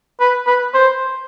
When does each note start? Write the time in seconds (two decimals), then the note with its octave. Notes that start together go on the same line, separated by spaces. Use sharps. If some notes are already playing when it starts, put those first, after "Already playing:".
0.20 B4
0.47 B4
0.74 C5